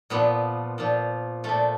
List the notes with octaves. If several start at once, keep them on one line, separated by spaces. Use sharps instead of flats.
A#2 F3 B3
A#2 F3
A#2 F3 A3